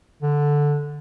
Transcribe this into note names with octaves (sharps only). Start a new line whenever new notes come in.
D3